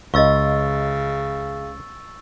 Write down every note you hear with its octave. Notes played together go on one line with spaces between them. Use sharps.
C#2 C#3 D#5 F5 C#6 E6 A6